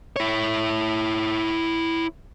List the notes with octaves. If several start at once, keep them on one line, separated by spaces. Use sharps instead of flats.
E4 C#5